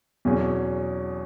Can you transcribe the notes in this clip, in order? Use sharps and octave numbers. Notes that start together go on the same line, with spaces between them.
E2 B2 F#3 C#4 G#4